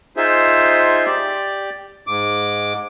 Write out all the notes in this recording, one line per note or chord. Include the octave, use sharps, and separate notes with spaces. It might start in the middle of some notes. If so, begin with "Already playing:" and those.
D#4 F4 G#4 C5 E5
G4 D5
G#2 D6